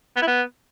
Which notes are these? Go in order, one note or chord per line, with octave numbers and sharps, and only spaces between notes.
B3
E4
B3